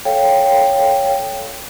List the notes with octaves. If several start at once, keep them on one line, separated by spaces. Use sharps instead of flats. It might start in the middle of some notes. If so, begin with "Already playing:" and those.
A4 C#5 F5 G5